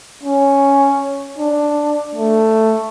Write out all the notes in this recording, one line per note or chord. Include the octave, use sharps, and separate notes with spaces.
C#4
D4
A3